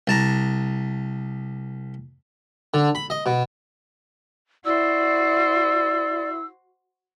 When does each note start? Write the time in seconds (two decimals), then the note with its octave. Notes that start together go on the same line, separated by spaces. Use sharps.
0.07 C2 A5 A#5
2.74 D3
2.95 B5
3.10 D#5
3.26 B2
4.65 E4 F#4 C5 D5 E6